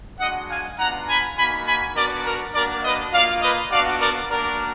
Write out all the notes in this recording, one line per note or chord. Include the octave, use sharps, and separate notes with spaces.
G#3 D4 F#4 D#5 F#5
F5 G#5
B3 D4 F4 F#5 A#5
G#5 B5
A#3 D#4 F#4 G#5 B5
G#5 B5
B3 D4 F#4 A#4 D5
A#4
A#3 D4 F#4 A#4 D5
B4 D#5
A#3 F4 D5 F5
B4 D#5
B3 D4 F#4 D5 F5
A#4 D5
A#3 D4 F#4 A#4 D5